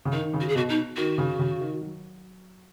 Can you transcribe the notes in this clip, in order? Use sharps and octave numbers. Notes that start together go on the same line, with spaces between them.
C#3
D#3 D#4
C#3
F#4
G#4
B2 F#4
D#4
D#3 F#4
C#3
C#3
D#3
F#3